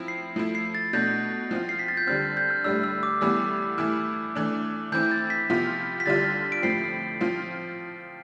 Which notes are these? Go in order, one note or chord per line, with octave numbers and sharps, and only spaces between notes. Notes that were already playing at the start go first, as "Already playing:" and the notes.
Already playing: F3 C4 E4
C7
F3 A3 E4
C7
A6
B2 A3 D4 G6
F3 C4 F4
C7
B6
A6
G6
D3 G3 C4 F6
G6
F6
A2 G3 D4 E6
E6
D6
A2 E3 G3 B3 E6
E3 A3 E4 F6
E3 A3 D4
E3 A3 C4 E4 G6
A6
B6
C3 F3 B3 F4
B6
D3 G3 D4 F4 A6
D7
A2 F3 C4 C7
F3 C4 F4